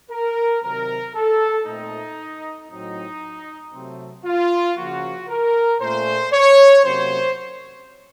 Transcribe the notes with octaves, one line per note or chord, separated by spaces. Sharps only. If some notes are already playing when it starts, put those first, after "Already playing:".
A#4
C3 D#3 F#3 C4 A#4
A4
A#2 A3 C4 D#4
A2 F#3 C4 D#4
C3 F#3 A3 C4
F4
C#3 F3 A#3 F#4
A#4
A#2 A3 C#4 C5
C#5
C3 F#3 A#3 C#4 C5